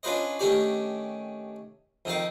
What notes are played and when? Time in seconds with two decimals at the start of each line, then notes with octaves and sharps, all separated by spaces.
0.03 C#4 D4 F4 B4 C5 D#5
0.39 D#3 A3 C#4 D4 G4 D5
2.05 F2 D#3 A#4 F5